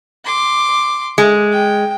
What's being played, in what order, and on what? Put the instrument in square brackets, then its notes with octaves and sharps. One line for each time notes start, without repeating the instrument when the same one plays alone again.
[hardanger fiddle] C6 D6
[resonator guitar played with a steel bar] G#3
[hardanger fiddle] G5